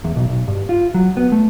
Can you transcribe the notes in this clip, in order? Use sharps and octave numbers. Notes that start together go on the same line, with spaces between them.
E2
B1
B1
G2
F4
F#3
B3
A3